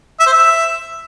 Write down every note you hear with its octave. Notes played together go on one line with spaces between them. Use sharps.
E5
C5
E5